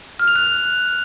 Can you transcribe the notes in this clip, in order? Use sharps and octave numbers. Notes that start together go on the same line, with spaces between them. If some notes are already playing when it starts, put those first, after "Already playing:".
F6
F7
F#6